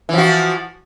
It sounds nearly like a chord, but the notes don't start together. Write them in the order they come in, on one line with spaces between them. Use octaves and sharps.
E3 F3 F#4